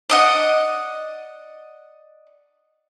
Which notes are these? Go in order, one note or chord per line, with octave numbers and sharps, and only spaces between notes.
D5 D#5 F#5